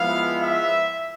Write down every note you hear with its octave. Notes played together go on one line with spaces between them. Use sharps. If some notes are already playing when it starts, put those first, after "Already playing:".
Already playing: F3 G#3 B3 E4 F5
E5